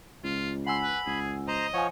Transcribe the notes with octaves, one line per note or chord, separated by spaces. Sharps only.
C#2 F4
F#5 G#5 B5 C6 E6
B4
C#2 G#4
C5 D#5 A#5
F3 C#5 F#5 G#5